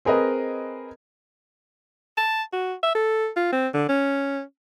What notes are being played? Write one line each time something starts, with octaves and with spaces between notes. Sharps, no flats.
C4 G#4 A#4 B4 D#5
A5
F#4
E5
A4
F4
C4
D3
C#4